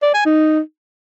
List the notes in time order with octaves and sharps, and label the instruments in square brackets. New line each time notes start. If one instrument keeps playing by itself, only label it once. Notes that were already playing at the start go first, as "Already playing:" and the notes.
[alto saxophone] D5
G#5
D#4